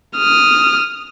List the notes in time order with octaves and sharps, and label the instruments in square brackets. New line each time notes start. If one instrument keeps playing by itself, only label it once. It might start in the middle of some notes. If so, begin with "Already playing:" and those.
[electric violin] D#6 F6